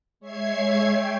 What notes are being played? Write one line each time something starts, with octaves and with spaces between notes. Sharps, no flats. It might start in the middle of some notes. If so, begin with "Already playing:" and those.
G#3 C#5 E5 G#6 C7
G5